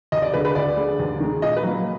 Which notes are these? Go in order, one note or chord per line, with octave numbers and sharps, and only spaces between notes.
D#2 D#5
D5
D3 G#3 B4
B4
D2 D5
D3 G#3
D#2
D#3 G#3
A#2 D#5
B4
F#3 A#3